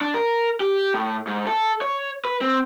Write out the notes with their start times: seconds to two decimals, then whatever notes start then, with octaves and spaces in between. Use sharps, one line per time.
0.01 D4
0.14 A#4
0.60 G4
0.94 A2
1.27 G#2
1.47 A4
1.81 C#5
2.25 B4
2.41 C4